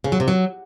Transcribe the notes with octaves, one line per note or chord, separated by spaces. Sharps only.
C#3
F#3
C3
F#3